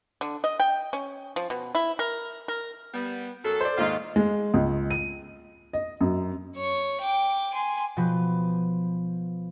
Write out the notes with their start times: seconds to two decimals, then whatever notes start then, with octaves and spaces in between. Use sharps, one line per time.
0.21 D3
0.44 D#5
0.60 G5
0.93 C#4
1.36 F3
1.50 B2
1.75 E4
1.99 A#4
2.48 A#4
2.94 G3 B3
3.44 F#2 A4
3.61 C5 D5
3.78 D#2 G#2 F4
4.16 G#3
4.54 C#2
4.90 D#7
5.73 D#5
6.01 F#2
6.56 C#5 C#6
7.01 G5 D6
7.54 G#5 C6
7.97 B2 F3 B4